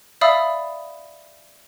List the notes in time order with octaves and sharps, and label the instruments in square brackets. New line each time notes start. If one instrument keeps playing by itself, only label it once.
[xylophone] D5 E5 F5 B5 D#6 E6